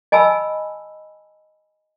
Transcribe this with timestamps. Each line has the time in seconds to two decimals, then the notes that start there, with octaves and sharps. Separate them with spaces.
0.12 D#5 G#5 A5 B5 E6